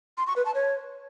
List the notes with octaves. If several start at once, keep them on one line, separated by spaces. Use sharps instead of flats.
C6
C#6
B4
A5
C#5